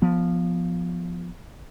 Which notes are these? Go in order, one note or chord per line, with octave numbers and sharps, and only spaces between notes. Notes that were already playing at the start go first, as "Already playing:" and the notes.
F3 B3